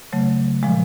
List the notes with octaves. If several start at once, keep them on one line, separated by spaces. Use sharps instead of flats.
C#3 F#3 A3
A#2 F3 G#3